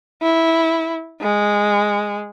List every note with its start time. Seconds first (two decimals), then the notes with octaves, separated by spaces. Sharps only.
0.22 E4
1.21 G#3